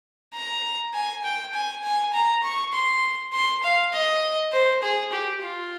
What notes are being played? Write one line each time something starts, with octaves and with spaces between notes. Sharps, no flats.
A#5
G#5
G5
G#5
G#5
A#5
C#6
C6
C6
F5
D#5
C5
G#4
G4
F4